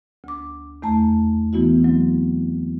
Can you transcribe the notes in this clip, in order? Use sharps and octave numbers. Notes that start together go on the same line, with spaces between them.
D2 D6
E2 A3 A5 A#5
E3 B3 E4 F#4
F#3 C4